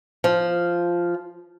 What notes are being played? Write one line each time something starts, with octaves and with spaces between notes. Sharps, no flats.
F3